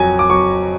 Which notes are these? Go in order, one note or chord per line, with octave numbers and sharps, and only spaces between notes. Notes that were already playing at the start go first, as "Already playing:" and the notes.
Already playing: F2 F#3 G#5
D6
F#3 C#6